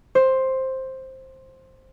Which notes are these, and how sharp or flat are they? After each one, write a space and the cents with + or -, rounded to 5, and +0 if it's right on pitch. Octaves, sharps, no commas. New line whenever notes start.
C5 +10